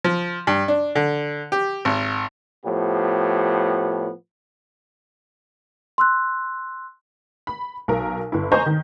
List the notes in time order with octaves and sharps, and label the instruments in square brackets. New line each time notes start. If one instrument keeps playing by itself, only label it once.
[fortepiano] F3
G2
D4
D3
G4
G#1
[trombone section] A2 F3 B3 G4
[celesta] C6 E6 F#6
[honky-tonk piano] B5
B1 A#4
G1 E4
C5 D#5 G#5 A#5 C#6 G6
D#3